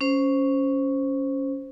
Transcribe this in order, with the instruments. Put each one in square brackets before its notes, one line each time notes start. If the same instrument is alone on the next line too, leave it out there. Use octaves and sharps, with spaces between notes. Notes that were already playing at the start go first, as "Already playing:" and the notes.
[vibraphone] C#4 C5